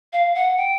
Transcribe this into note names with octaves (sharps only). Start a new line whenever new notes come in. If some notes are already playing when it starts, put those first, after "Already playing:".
F5
F#5
G5